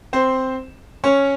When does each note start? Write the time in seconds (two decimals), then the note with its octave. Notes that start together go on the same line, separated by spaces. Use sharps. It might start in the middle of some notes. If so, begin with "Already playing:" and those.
0.13 C4 C5
1.04 C#4 C#5